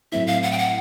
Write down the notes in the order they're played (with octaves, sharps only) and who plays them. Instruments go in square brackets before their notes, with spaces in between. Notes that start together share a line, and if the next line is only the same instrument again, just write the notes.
[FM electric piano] A2 F#3 A3 C4 E4 [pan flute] E5
[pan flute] F5
F#5
G5
F#5